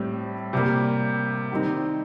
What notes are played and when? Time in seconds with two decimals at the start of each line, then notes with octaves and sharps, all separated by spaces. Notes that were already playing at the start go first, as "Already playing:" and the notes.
Already playing: A2 G3 C4
0.53 C3 G3 A#3
1.52 D#3 G3 C4 D#4